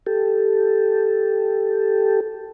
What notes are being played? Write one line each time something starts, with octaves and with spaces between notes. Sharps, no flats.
G4 A4